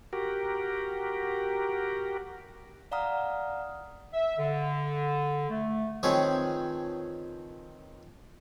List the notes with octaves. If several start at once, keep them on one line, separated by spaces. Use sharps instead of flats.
F#4 G4 A#4
D5 F5 F#5 A#5 D#6 F6
E5
D3
A3
D#3 F3 C4 G#4 B4 C#5